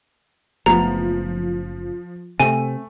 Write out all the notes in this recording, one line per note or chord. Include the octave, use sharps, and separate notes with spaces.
F#1 F3 A3 B3 A#5
C3 A3 C4 G#5